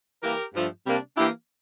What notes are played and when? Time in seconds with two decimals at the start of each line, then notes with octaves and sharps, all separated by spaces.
0.23 E3 G3 A#3 G4 A#4
0.54 G2 F3 A3
0.85 C3 G3 A#3 D4
1.16 E3 A#3 D4 E4 G4